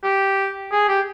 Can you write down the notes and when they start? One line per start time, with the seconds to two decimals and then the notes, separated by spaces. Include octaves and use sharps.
0.04 G4
0.72 G#4
0.88 G4